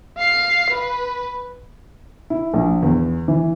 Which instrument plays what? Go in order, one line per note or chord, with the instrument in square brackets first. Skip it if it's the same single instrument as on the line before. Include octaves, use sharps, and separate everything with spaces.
[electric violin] F5 C7
B4
[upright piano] E4
A#1
E2
E3